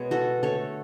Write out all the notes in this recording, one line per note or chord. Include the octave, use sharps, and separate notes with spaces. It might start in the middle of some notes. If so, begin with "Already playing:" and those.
Already playing: B2 G#3 B3 C#5
F#4 A4
D3 A3 A4 C#5